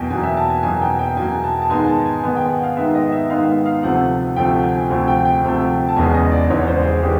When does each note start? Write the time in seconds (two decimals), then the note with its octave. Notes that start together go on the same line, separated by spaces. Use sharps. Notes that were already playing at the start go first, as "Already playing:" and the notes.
Already playing: E2 B2 F#3 A#3 G5 G#5
0.10 E2 B2 F#3 A#3 G#5
0.23 E5
0.37 A5
0.50 G#5
0.63 E2 B2 F#3 A#3 G#5
0.82 G5
0.99 G5
1.17 E2 B2 F#3 A#3 G#5
1.44 A5
1.62 A5
1.70 G#2 D#3 G#3 B3 G#5
1.88 A5
2.06 G#5
2.24 G#2 D#3 G#3 B3 G#5
2.37 G5
2.50 F#5
2.63 F5
2.77 G#2 D#3 G#3 B3 E5
2.95 D#5
3.12 E5
3.30 G#2 D#3 G#3 B3 F5
3.66 F5
3.83 D2 C3 F3 A3 F#5
4.36 D2 C3 F3 A3 G5
4.63 G#5
4.90 D2 C3 F3 A3 G#5
5.08 G5
5.25 G5
5.43 D2 C3 F3 A3
5.88 A5
5.96 E1 E2 C#3 E3 G#3 G#5
6.14 D#5
6.32 D5
6.50 E1 E2 C#3 E3 G#3 C#5
6.68 C5
6.85 G#4
7.03 C#3 E3 G#3 G4